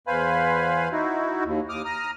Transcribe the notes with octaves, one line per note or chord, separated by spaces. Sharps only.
E2 B4 C5 F5 G#5 B5
D#4 E4 F#4
D#2
D#2 D6 D#6 F6
A#5 D#6 F6